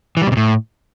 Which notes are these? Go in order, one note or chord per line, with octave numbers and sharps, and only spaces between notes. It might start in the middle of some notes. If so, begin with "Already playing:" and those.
E3
G3
B2
C3
A2